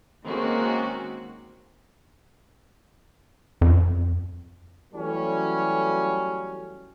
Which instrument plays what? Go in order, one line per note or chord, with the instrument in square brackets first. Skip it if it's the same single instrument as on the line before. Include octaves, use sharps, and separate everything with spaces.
[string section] D#3 G#3 A#3 C4 C#4 F#4
[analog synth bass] F2
[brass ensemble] E3 F#3 G3 A3 C#4